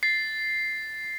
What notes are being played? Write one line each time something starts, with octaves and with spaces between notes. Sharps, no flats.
A6 C7